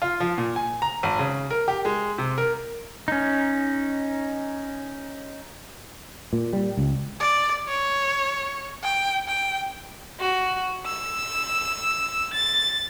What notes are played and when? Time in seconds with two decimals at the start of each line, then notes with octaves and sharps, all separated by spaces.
0.02 F4
0.20 F3
0.38 A#2
0.56 G#5
0.82 A#5
1.03 G#1
1.19 C#3
1.51 A#4
1.68 G4
1.85 G#3
2.18 C3
2.38 A#4
3.08 C#4 D#4
6.33 A#2
6.53 G3
6.77 C#2
7.20 D5
7.68 C#5
8.83 G5
9.28 G5
10.21 F#4
10.86 E6
12.34 A6